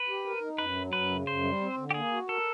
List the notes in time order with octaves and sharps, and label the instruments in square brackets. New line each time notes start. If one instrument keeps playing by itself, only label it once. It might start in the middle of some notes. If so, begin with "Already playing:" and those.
Already playing: [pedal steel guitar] B4
[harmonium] G4
A#4
D#4
[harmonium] F#2 [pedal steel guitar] B4
[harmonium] F#3
[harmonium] F#2 [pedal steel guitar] B4
[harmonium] C#3
[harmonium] F#2 [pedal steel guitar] C5
[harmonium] G3
C4
D3
[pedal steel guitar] G4
[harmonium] A#3 [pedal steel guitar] G#4
[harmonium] F#4
[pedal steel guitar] A4 [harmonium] A#4